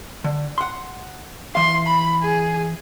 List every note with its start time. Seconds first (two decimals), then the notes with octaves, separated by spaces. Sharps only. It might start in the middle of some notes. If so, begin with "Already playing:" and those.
0.24 D3
0.58 F#5 C6
1.55 E3 F5 C6
1.86 B5
2.22 G#4